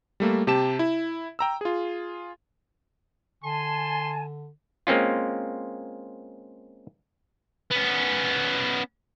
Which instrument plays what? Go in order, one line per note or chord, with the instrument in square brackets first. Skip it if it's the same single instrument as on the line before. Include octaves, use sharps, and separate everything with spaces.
[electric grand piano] G3 A3 A#3
C3 G4 A5 E7
E4
G5 A#5 E6
F4 G#4
[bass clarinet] D3 [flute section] G#5 A5 [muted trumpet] C6
[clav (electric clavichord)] G#3 A#3 C4 C#4 F4
[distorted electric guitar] B3 C#4